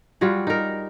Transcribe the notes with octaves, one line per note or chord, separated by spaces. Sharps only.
G3 F4 F#4 G#4
D#4 A#4